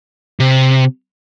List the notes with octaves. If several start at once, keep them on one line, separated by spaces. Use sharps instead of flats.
C3